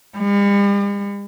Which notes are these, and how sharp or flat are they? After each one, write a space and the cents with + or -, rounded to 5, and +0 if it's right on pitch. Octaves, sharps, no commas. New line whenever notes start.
G3 +45